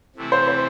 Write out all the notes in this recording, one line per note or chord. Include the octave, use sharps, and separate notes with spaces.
C3 E3 A3 C4 E4
C5
C5